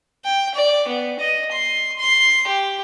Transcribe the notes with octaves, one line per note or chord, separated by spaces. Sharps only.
G5
D5
B3
D#5
C6
C6
G4